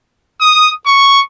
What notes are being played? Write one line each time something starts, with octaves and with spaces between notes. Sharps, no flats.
D#6
C#6